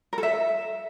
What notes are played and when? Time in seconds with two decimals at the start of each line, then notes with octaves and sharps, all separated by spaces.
0.13 A#4
0.18 A4
0.23 E5